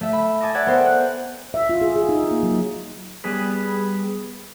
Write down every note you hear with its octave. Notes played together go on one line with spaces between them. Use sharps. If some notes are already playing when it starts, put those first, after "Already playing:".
A3 E5
B5
G#5 A5 D6 D#6 A#6
D5 E5 F#5 G#5 G#6
B3 A4 A#4 C5 G5
F#6 G6
E5
F4
G#4
G#4
D#4
A#3
F#3
G3 B3 G#4 B4